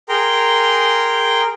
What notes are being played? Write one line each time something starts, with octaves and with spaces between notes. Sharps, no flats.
G#4 A#4 G5 A#5 C6